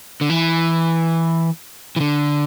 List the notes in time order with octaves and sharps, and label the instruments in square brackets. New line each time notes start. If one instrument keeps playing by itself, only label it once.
[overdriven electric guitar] D3
E3
E3
D3